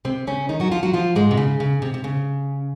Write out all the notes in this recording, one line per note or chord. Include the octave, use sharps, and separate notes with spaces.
C3 C4
C#3 C#4
D#3 D#4
F#3 F#4
F3 F4
F#3 F#4
F3 F4
G#2 G#3
C3
C#3
C#3
C3
C3
C#3